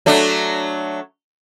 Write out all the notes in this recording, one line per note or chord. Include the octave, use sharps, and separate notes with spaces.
F#3 A3 D4